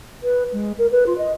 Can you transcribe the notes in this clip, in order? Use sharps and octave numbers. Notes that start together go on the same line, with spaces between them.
B4
G#3
A#4
B4
F4
D#5